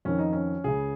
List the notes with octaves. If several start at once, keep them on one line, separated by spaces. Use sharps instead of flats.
F2 D#3 C#4
D#4
C#4
C#2 C#3 G#4